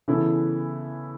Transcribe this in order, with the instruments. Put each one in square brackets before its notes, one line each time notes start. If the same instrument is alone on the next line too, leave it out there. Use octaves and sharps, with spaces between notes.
[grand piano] C#3 E3 B3 E4 A4